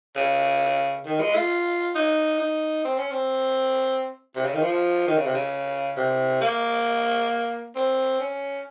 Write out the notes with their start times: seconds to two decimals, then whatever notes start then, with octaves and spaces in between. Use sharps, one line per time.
0.16 C#3
1.06 D#3
1.20 G#3
1.35 F4
1.95 D#4
2.39 D#4
2.85 C4
2.98 C#4
3.11 C4
4.36 C3
4.45 C#3
4.54 D#3
4.62 F3
5.08 D#3
5.17 C#3
5.26 C3
5.35 C#3
5.97 C3
6.41 A#3
7.76 C4
8.20 C#4